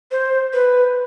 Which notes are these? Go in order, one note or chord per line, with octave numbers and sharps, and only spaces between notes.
C5
B4